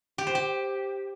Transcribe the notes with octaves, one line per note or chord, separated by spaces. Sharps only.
G4
C5
G4